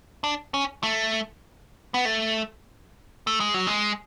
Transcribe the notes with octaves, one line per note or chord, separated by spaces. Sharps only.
D4
C#4
A3
B3
A3
A3
G#3
F#3
G#3